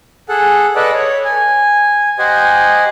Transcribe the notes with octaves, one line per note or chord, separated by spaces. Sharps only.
G#4 A4 F#5
A4 B4 D5 D#5 F#5
C#5
G#5
G4 C5 D#5 F#5 G#5